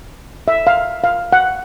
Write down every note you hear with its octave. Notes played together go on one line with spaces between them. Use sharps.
E5
F5
F5
F#5